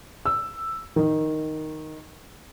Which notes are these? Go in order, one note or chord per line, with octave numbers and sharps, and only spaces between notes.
E6
D#3